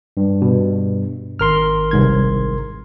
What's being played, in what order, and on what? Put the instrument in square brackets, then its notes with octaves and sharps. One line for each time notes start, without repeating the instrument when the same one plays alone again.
[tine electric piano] G2
[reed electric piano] B2
[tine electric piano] G#1 A#4 C6 [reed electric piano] F6
[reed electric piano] C2 G#2 G#6